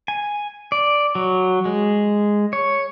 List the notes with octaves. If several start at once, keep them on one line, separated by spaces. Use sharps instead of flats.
G#5
D5
F#3
G#3
C#5